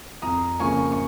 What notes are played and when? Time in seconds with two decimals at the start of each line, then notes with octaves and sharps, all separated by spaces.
0.22 F2 A#5 D#6
0.60 C#3 F3 A#3 G#5 C#6
0.92 C#6